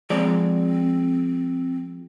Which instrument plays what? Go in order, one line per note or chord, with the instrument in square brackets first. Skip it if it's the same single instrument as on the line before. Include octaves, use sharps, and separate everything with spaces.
[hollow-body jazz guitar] F3 G#3 D5 [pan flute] C4